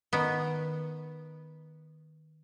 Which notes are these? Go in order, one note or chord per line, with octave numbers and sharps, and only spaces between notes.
D#3 B3